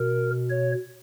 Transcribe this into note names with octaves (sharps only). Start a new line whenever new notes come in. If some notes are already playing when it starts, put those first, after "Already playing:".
Already playing: B2 A#4
C#5